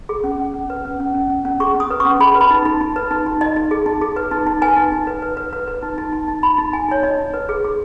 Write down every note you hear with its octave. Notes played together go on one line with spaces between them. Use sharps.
G#4
C#4
C#4
C#4
B4
C#4
C#4
C#4
C#4
C#4
G#4 C#6
C#4
D#6
B4
C#6
C#4
G#4 B5
B4
B5
D#4
D#4
D#4
B4
D#4
D#4
D#4 D#5
D#4
G#4
D#4
G#4
B4
D#4
D#4
B4 G#5
D#4
D#4
B4
B4
B4
B4
B4
D#4
D#4
D#4
D#4
D#4 B5
D#4
D#4 G#5
D#4 C#5
D#4 D#5
D#4
B4
G#4
G#4